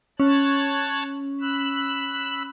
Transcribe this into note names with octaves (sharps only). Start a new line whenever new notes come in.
C#4 C#5 A5 F#6
B5 E6 F#6